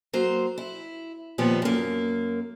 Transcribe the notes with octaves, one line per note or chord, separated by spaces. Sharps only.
F#3 A#3 C5
E4
D#2 A#2 F3 B3 G4 C#5
F#2 A#3